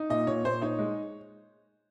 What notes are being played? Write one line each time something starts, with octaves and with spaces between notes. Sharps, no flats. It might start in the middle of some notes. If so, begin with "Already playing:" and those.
Already playing: D#4
A#2 D#5
A#2 C#5
A#2 C5
D#4 C#5
G#3